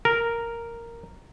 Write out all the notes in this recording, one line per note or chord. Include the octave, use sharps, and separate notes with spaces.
A#4